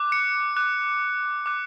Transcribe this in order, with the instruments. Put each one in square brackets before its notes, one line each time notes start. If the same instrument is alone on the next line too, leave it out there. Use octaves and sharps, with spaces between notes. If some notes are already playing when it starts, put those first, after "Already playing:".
Already playing: [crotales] D6 F#6
C#7
D6 F#6
D6 F#6